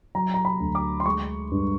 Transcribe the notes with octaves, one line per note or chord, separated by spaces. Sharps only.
F#3 A#5
A#5
B5
D2
D6
C6
G#3 C#6
G2